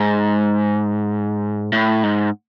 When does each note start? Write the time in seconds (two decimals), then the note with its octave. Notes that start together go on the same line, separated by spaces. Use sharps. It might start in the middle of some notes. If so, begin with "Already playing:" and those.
Already playing: G#2
1.73 A2
2.03 G#2